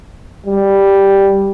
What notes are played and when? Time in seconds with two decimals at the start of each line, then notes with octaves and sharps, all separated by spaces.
0.47 G3